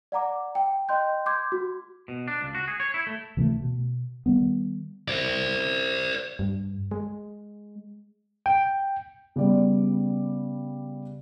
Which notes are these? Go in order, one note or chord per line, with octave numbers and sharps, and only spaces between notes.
D5 F#5 A#5 D6
G5
D#5 G5 C6 F#6 G6
C6 D6 G6 G#6
F#4
B2
D4
C#2
F#4
G#4
C#5
E4
A3
C3 E3 F#3 A3
B2
D#3 G3 B3
C5 D5
G2
G#3
G5
C#3 G3 B3 D5